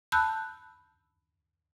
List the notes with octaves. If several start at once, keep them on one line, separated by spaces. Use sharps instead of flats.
A5 B5 E6 F#6 G6